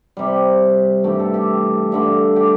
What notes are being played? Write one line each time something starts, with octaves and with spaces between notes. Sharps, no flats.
C3 G3
G2 E3 A3 G4
A4
G4
G2 D3 A3
G4